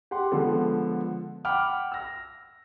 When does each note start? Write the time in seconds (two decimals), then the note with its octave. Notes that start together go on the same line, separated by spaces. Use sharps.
0.11 G4 F#5 C6
0.32 D3 F3 G#3 B3 A4
1.45 F#5 G5 B5 D6 F6
1.92 E6 A#6